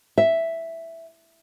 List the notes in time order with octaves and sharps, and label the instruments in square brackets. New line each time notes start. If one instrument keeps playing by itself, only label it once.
[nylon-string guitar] E5